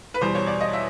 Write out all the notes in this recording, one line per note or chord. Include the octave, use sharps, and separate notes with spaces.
B4
E2 B2 G3 C5
C#5
D5
D#5
E5